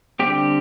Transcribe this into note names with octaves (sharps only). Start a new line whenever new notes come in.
D3 G3 C4 G4